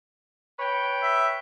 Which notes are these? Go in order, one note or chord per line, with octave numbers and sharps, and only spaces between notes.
B4 C#5 G5
E5